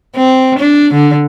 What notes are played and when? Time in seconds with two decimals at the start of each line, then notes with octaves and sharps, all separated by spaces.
0.16 C4
0.59 D4
0.94 D3